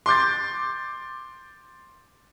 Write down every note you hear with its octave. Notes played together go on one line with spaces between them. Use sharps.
C6 D6 G6 A6